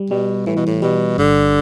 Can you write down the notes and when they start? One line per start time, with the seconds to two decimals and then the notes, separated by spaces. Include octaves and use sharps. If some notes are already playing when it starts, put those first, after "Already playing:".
Already playing: G3
0.10 B2 G3
0.47 A2 E3
0.56 B2
0.66 A2
0.82 B2 G3
1.18 G1 D3